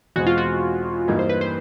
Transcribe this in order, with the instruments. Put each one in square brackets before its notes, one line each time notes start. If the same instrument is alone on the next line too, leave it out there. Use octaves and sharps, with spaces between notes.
[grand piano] E2 B2 G#3 C4 [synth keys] F#4
[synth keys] F4
F#4
[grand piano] G2 E3 G3 A#3 D#4
[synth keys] C5
B4
C5